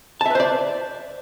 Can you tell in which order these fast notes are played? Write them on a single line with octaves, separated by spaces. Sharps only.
A5 E5 B4 C5 D5